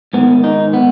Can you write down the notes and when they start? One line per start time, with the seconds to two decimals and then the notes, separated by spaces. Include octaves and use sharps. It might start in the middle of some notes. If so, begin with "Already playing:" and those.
0.13 G#2 D#3 B3
0.44 D#4
0.73 B3